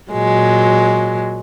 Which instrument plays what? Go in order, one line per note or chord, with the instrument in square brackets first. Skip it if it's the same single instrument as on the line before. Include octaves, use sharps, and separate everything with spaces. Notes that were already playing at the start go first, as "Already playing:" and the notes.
[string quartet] A#2 F#3 G#3